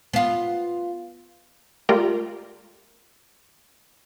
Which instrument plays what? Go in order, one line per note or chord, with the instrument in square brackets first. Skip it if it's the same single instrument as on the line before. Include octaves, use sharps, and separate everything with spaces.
[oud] B3 F4
[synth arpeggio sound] G#3 A3 F4 G4 A#4 D5